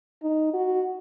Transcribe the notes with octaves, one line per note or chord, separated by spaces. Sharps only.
D#4
F#4